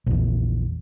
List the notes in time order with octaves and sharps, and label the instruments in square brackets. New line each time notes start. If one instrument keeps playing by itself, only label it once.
[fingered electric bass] A#1 E2